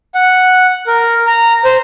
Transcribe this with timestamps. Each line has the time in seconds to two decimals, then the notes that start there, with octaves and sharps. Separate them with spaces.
0.15 F#5
0.87 A#4
1.27 A#5
1.65 C5